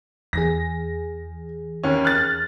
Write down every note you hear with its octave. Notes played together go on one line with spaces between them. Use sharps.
E2 E3 G#4 A#6
D#2 C#4
F6 F#6 A6